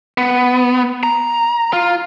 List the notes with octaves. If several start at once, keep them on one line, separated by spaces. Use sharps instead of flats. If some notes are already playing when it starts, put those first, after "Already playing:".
B3
A#5
F4